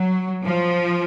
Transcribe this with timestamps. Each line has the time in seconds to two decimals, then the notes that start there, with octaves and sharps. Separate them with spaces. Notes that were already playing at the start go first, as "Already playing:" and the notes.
Already playing: F#3
0.45 F3